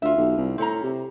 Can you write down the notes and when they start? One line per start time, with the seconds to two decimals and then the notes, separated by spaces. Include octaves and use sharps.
0.02 D2 F4 E5
0.17 B1
0.37 C2
0.58 A2 C4 C#4 A#5
0.83 C3